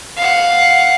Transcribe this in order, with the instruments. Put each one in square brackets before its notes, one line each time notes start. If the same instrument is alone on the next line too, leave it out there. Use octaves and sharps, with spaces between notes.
[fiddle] F5 F#5